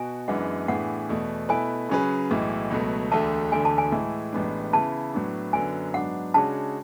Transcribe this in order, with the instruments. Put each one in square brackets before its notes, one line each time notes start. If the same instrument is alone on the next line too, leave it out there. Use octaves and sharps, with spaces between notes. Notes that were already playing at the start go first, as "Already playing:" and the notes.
Already playing: [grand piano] B2 F#4 [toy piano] G#5
[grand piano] F#2 E3 G#3 B3 D4 [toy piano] F#5
[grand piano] A2 E3 B3 D4 G#4 [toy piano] F#5
[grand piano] E2 B2 A3
[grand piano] B2 A3 E4 B4 [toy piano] G#5
[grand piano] C#3 F#3 C#4 G#4 B4
B1 A2 E3 G#3
C#2 B2 F#3 A3
[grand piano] E1 D2 D3 A3 [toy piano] A5
[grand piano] E1 D2 D3 A3 [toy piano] G#5
[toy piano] A5
G#5
[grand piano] A2 E3 G#3
A1 A2 G#3 B3 D4
[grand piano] C#3 E3 B3 E4 [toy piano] A5
[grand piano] A2 F#3 B3 D4
[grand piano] F#2 D3 F#3 B3 [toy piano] G#5
[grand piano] G#2 F#3 B3 D4 [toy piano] F#5
[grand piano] C#3 G#3 D4 F#4 C#5 [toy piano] A5